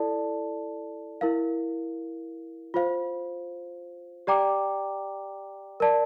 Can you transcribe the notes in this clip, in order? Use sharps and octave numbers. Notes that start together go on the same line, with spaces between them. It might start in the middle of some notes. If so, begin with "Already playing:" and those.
Already playing: E4 A4 D5 A5
E4 A#4 F5
F4 C5 F5
G4 D5 G5 A#5 D6
A#4 D5 A5